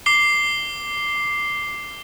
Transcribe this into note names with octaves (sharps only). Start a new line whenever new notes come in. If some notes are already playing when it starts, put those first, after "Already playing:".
D6 C7 G7